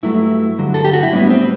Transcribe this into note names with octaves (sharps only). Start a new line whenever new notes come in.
G2 F#3 A3 E4
G2 D3 F#3
A4
G4
F#4
E4
A2 G3 B3 D4
C4